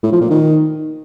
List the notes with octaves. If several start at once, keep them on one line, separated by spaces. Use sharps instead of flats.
A2
F3
A#2
D#3